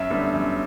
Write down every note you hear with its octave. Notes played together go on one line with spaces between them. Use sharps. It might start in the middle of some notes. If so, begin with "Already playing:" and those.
Already playing: F#2 E5
D3 G3 B3
F#2